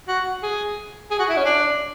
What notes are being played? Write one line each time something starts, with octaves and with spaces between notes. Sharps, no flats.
F#4
G#4
G#4
F#4
E4
C#4
D4